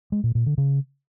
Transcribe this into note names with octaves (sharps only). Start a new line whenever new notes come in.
G#3
A#2
A#2
D3
C#3